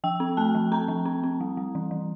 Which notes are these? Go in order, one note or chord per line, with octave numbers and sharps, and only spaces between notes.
F3 G5
C4
A3 A5
F3
C4 A#5
F3
C4
C4
G3
G3
E3
E3